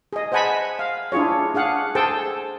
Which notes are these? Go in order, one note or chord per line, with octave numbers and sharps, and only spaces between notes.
G#4 D#5
C5 D#5 F#5 G#5 A5 B5
F5
D4 E4 F4 G#4 C#5
D4 G#4 F5 F#5
G#4 A4 C5 G5 A5